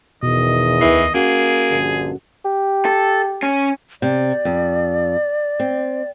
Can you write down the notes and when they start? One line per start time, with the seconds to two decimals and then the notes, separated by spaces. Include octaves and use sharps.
0.23 E2 B2 D#3 D#5
0.81 D2 E3 C7
1.14 A#3 C#4 F#4 G#4 F#5
1.71 A#1 G2 D3
2.45 G4
2.85 A4
3.43 C#4
4.02 C3 D5
4.45 F2
5.60 C4